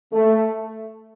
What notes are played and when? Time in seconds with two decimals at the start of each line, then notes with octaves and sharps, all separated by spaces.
0.13 A3